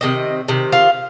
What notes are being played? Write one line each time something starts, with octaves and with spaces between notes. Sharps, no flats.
C3 D#3 D#5
C3 D#3
F4 F5